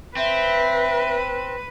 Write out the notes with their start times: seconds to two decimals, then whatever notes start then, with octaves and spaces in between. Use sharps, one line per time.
0.17 C4 B4 E5